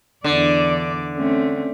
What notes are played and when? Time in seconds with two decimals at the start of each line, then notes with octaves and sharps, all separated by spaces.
0.24 E2 D3 D5
1.15 A3 C4 C#4